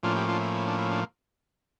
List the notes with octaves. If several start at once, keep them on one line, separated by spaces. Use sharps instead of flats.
A2 F3 A#3 C#4 D4 F4
E4 G4
D4 F4
E4
E4
D4
E4
D4